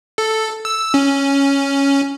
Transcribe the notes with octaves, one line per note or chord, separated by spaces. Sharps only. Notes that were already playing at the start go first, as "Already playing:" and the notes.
A4
E6
C#4